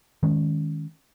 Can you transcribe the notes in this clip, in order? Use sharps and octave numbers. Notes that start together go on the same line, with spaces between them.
D#3 G#3 C#4